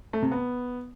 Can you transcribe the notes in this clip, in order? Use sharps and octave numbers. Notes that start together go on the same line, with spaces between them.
A3
C3
B3